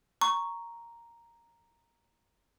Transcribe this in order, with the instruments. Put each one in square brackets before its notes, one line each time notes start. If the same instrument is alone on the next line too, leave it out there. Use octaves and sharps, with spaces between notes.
[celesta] A#5 [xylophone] C#6